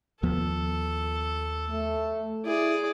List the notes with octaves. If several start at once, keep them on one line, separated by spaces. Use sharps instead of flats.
D#2 F3 B3 A4
A3
E4 G#4 D5